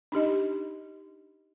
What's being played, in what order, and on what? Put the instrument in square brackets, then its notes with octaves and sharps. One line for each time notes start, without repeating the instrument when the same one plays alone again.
[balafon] D4 D#4 G4 D#5